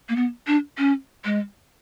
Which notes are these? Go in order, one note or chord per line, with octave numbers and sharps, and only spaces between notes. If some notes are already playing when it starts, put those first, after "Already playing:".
A#3
B3
D4
C#4
G#3